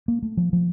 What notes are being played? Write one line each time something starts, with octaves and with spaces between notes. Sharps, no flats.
A#3
A3
F3
F3